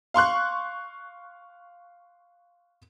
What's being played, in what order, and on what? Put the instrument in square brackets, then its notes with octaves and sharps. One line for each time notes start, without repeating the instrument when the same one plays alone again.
[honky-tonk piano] F5 C6 C#6 F#6